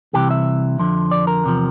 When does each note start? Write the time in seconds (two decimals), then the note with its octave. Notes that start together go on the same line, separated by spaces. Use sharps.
0.13 C2 C3 E3 G4
0.31 E5
0.78 F2 D3 F3
1.11 D5
1.27 A#4
1.44 E2 C3 F3